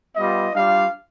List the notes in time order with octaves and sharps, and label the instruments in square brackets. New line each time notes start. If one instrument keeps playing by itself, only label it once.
[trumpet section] G3 B3 F4 D#5
G3 D4 F4 F5